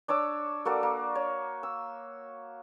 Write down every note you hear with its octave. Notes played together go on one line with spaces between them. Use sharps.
D4 C#5 D6 E6
A#3 F#4 A4 D5
A#3
C#5
E6